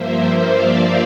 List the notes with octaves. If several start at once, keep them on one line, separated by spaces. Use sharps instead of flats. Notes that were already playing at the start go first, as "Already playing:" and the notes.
Already playing: G2 F3 A#3 C5 E5
D5 F5